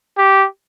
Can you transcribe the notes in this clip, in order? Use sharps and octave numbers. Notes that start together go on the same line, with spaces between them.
G4